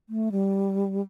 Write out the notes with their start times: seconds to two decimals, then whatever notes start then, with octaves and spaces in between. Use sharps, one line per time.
0.09 A3
0.32 G3